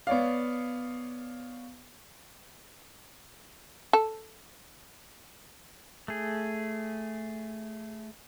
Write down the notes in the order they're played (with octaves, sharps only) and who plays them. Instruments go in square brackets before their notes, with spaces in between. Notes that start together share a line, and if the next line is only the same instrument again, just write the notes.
[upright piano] B3 C#5 D5 F5
[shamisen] A4
[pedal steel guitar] A3 G#4